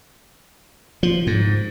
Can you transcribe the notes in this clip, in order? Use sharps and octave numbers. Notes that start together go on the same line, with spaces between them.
F3
G#2